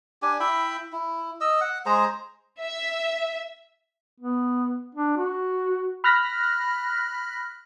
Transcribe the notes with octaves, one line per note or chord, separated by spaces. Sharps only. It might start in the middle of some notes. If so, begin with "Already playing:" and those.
D4 G4 G#5
E4 E5 G5 B5
E4
D#5 E6
F#5
G#3 G#4 C5 A#5
E5
B3
D4
F#4
B5 F6 F#6 A#6 B6